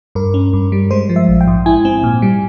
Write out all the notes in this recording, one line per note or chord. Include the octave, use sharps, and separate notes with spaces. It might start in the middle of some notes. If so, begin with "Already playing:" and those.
G2 A#4
C#4
G2
G3
G#3 C5
F3
E5
A#1
G5
G#2
E4 G#5
C4
A#2
G3